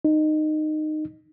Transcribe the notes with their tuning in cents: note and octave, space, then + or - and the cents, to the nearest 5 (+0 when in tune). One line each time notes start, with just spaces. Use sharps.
D#4 -15